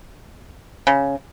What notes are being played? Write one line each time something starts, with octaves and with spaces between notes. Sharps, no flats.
C#3